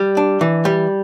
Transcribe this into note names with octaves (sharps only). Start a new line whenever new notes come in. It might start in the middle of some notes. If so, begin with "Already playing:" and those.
Already playing: G3
D4
E3
G3